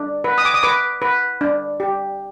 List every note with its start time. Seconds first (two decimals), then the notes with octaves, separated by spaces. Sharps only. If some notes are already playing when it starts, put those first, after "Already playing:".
Already playing: D4
0.24 B4
0.38 D#6
0.45 D6
0.54 D#6
0.63 B4 D6
1.02 B4
1.41 D4
1.80 G4